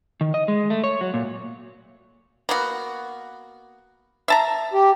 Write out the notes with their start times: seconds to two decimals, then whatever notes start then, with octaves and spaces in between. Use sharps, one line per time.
0.21 D#3
0.34 D#5
0.48 G#3
0.70 A3
0.84 C#5
1.01 F#3
1.14 A#2
2.49 A#3 B3 F#4
4.28 E5 A5 A#5
4.73 G4